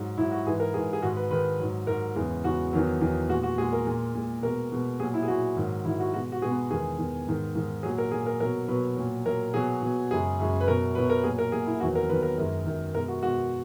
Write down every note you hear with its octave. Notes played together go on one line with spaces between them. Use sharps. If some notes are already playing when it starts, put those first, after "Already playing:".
Already playing: G#2 F#3
G#2 F#3 E4
F#4
G#2 E3 G#3 G#4
A#4
G#2 E3 G#3 G#4
G#4
G#2 D#3 G#3 F#4
B4
G#2 D#3 G#3 B4
G#2 F#3
G#2 F#3 A#4
E2 C#3 G#3
E2 C#3 G#3 F#4
E2 D#3 F#3
E2 D#3 F#3
A#2 G#3 F#4
F#4
A#2 G#3 G#4
A#4
A#2 G#3
A#2 G#3
B2 G#3 A#4
B2 G#3
A#2 F#3 G#4
E4
G#4
A#2 F#3 F#4
G#2 D#3 F#3
G#2 D#3 F#3 E4
F#4
B2 G#3 F#4
F#4
B2 G#3 G#4
B3
E2 D#3 G#3 G#4
E2 D#3 G#3
G#2 D#3 G#3
G#2 D#3 G#3
A#2 F#3 G#4
A#4
A#2 F#3 G#4
A#4
B2 F#3 A#4
B2 F#3 B4
A#2 F#3
A#2 F#3 A#4
B2 F#3 G#4
B2 F#3
F#2 C#3 G#3 G#4
F#2 C#3 G#3
B4
B2 F#3 A#4
B2 F#3 B4
A#4
A#2 F#3 G#4
A#4
A#2 F#3 G#4
E4
E2 D#3 F#3 F#4
A#4
E2 D#3 F#3 B4
A#4
F#2 D#3 G#3 A#4
F#2 D#3 G#3
B2 G#3 A#4
F#4
B2 G#3 F#4